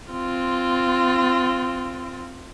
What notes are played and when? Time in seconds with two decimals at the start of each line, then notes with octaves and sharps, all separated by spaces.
0.11 C4 F4